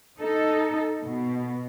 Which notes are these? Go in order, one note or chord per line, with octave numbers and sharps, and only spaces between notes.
D#4 A4
B2